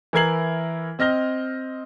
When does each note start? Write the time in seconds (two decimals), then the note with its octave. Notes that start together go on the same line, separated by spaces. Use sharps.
0.13 E3 E4 A#4 G#6 C7 F#7
0.99 C4 D#5 F6 A#6 G7